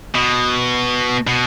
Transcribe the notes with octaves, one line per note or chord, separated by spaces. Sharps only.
B2
B2